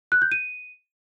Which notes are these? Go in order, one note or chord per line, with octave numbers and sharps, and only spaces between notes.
F#6
G6
D#7